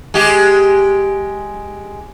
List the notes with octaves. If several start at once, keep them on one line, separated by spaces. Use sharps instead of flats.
G#3 G4